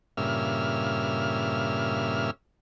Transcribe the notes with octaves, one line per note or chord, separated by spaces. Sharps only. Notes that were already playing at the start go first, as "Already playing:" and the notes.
G2 A#2 C#3 E5 F6